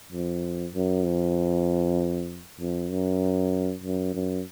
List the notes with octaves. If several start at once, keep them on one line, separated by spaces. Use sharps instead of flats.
F2
F#2
F2
F2
F#2
F#2
F#2